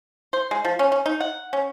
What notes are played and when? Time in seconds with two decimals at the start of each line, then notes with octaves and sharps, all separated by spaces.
0.33 C5
0.51 G#3
0.65 F3
0.79 C#4
0.92 C#4
1.06 D#4
1.20 F#5
1.53 C#4